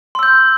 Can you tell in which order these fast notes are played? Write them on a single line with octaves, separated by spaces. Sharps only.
C6 E6 G6